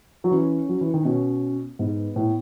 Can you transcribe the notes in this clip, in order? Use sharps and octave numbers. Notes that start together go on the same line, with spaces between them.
F#3
E3 C#4
F#3
E3
D#3
B2 C#4
G#2 B3
A2